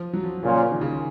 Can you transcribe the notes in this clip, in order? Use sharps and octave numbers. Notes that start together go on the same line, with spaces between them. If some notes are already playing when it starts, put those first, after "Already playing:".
Already playing: F3
F#3
F3
A#2 C#3 F3 A#3 C#4 F4
D#3
C#3